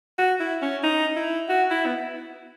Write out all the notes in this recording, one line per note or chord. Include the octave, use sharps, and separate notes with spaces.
F#4
E4
C#4
D#4
E4
F#4
E4
B3